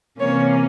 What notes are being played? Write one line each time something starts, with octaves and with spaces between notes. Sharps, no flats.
C3 E3 A#3 C#4 C#5